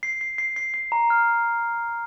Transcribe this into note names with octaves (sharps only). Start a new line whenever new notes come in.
C7
C7
C7
C7
C7
A#5
F6